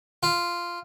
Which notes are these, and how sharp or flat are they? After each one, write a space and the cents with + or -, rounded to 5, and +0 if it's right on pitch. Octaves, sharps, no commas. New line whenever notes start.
F4 -10